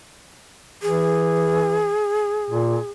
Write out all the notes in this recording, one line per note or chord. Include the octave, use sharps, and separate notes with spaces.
E3 G#4
A#2